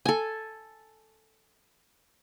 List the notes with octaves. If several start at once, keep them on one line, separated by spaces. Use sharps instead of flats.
A4 G#5